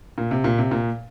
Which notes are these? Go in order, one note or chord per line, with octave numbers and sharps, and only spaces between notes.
A#2
C3
A#2
C3
A#2